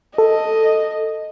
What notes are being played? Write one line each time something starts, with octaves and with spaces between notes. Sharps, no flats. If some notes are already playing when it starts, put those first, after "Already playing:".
A4 D#5